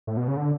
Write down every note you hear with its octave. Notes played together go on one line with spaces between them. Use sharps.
A2
B2
C#3
D3